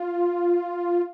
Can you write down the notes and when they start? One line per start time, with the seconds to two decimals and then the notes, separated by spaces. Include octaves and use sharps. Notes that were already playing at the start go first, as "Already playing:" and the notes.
Already playing: F4